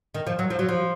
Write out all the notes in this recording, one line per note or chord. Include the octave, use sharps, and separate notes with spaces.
D#3
F3
F#3
F3
F#3
F3